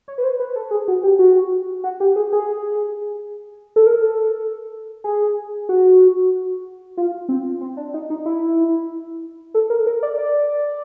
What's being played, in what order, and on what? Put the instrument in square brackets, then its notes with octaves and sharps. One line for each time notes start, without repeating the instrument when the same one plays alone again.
[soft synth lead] C#5
B4
C5
B4
A4
G#4
F#4
G4
F#4
F#4
G4
G#4
G#4
A4
A#4
A4
G#4
F#4
F4
C4
C4
D4
D#4
D#4
E4
A4
A#4
A#4
D5
D5